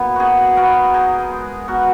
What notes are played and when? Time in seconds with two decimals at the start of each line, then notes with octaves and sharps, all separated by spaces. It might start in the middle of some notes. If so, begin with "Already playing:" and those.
Already playing: F#2 A#3 B3 E4
0.16 D#4 F#4 G#4
0.57 B3 F#4 A#4
0.94 D#4 G#4
1.32 G#3
1.68 B2 F#4 A#4